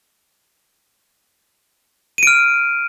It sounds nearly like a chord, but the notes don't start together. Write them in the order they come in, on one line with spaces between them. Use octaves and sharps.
D#7 D7 F6